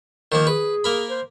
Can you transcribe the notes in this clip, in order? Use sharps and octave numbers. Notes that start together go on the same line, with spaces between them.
D#3 F3 A#3
G#4 B4
A#3 A#4 B5
C5